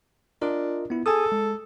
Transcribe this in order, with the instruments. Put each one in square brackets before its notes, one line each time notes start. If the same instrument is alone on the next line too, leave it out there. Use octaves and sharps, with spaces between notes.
[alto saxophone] D4 [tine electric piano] F4 A#4 D#5
[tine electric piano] B3 E4
[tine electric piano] G#4 G#5 D#6 [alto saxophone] A4
[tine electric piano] G#3